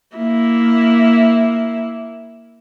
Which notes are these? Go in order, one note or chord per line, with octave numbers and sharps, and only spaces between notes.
A#3 E4